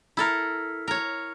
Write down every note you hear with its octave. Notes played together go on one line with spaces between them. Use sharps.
E4 A4 A#4
A#4 C#5